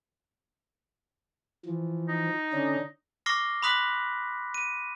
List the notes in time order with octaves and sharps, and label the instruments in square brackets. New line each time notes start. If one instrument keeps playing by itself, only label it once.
[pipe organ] E3 F3
[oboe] D#4
[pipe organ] D3 C#4 D4
[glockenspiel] C#6 D6 F6 A#6 C7
B5 C6 D#6 F#6 B6
D#7